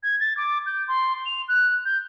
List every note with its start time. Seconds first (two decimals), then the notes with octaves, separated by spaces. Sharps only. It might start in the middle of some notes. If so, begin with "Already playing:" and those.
0.03 G#6
0.20 A6
0.37 D6
0.66 G6
0.88 C6
1.26 F7
1.48 F#6
1.85 G6